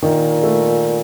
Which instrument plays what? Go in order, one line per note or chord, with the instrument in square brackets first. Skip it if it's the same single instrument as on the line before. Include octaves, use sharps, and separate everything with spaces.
[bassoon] A#2 [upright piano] D#3
[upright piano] A3